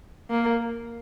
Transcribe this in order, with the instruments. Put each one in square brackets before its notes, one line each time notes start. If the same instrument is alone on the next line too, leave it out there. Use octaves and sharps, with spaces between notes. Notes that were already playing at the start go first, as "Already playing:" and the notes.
[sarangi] A#3